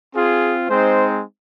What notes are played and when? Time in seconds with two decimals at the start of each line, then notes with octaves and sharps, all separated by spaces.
0.16 C4 F4 G#4
0.69 G#3 C4 D#4 C5